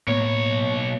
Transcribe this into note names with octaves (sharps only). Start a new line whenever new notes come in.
B1 A2 A#3 B3 C#5